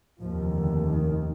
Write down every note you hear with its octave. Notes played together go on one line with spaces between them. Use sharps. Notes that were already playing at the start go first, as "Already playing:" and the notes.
F1 D#2 F3
D3
D#3